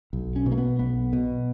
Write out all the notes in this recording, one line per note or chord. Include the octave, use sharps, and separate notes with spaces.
B1
C#4
B2
A#3
B3
B1 B3
B2